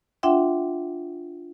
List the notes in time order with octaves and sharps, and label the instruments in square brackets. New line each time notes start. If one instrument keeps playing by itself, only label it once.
[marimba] D4 F4 E5 F#5 G5 C6